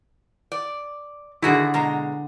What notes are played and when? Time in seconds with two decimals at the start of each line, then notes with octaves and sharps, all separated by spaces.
0.52 D5
1.42 D3 D#3 E4 F#4 G#4
1.74 B2 G#3 A#5